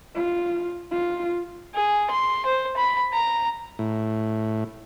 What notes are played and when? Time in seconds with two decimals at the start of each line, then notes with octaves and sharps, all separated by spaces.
0.15 F4
0.91 F4
1.74 G#4
2.10 C6
2.46 C5
2.77 B5
3.13 A#5
3.79 A2